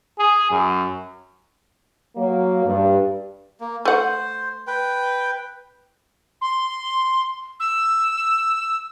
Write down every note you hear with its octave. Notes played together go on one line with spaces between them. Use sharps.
G#4
F#2
F#3 A#3
G2
A#3
A3 C5 F#5
B4 G5
C6
E6